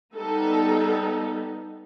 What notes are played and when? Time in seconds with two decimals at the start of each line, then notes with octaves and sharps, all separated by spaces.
0.14 G3 B3 D#4 A4